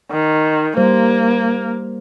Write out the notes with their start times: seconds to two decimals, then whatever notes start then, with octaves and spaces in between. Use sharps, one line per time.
0.11 D#3
0.77 G3 A#3 C5